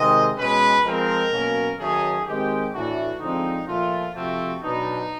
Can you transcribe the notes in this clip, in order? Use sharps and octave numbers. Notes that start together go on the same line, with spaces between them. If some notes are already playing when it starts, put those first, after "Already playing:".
Already playing: C3 D#3 G#3 C4 D#5
B2 G#3 C#4 B4
F3 G#3 C4 A#4
B2 F#3 A#3 C#4
D#3 F#3 A3 C#4 G#4
D#3 G#3 C4 G4
A2 E3 A3 D4 F#4
D3 F3 G#3 C4 D#4
A#2 F3 A3 F4
C3 F3 A3 C4 F#4
B2 F#3 B3 D4 D#4